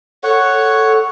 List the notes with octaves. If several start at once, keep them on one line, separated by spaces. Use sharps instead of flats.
A4 C#5 F#5